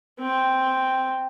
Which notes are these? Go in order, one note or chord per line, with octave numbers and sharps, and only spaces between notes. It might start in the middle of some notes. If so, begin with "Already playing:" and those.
C4